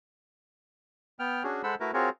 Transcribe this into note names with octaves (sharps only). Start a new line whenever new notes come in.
B3 G5 F6
C#4 D4 F#4 G#4
G#3 A4 C5 F#5 B5 E6
A3 E4 F#4 A#4 B4
C4 F4 F#4 G#4 A#4 C#5